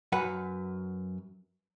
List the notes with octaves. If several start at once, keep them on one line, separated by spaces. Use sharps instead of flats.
F#2 B4 F#5